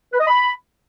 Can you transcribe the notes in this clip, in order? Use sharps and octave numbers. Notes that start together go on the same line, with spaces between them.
B4
D#5
B5